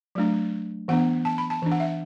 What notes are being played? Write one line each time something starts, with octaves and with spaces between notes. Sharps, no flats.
F#3 A3 D4
E3 B3 D4 F#5
A5
B5
A5
E3 D4
F#5
E5